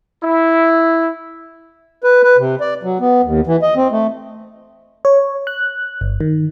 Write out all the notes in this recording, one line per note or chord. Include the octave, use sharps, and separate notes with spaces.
E4
B4
B4
C3
D5
F#3
B3
D#2
E3
D#5
C4
A3
C#5
F#6
G1
D#3